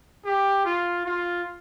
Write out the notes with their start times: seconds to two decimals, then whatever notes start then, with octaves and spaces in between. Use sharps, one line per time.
0.25 G4
0.65 F4
1.06 F4